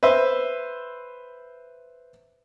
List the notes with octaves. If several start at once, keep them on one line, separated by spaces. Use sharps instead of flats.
B4 C5 E5